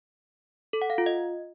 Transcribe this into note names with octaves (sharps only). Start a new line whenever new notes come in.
A4
F#5
F5
F4
D#5